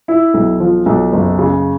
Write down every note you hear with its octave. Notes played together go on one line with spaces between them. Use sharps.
E4
B1
F3
B1
F#1
C#3